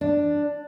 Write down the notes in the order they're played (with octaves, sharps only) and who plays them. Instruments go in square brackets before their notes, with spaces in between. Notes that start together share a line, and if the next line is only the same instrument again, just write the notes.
[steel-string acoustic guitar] D4